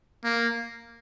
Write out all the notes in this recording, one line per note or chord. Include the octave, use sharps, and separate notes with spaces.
A#3